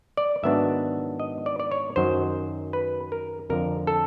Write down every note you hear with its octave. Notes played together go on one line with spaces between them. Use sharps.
D5
G#2 D#3 F#3 B3 D4 E5
D#5
D5
D5
C#5
F#2 D#3 F#3 C5
B4
A#4
F2 D3 F3 A#4
A4